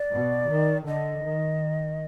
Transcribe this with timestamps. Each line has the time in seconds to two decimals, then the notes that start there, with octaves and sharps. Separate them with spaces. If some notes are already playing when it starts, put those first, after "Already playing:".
Already playing: D5
0.11 B2
0.48 D#3
0.87 D3 D#5
1.25 D#3